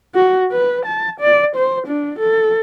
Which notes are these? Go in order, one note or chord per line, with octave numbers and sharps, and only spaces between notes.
F#4
B4
A5
D5
C5
D4
A4